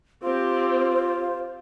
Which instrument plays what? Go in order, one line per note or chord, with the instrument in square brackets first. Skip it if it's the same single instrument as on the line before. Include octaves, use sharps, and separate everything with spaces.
[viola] C4 G4 [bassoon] F4 [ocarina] C5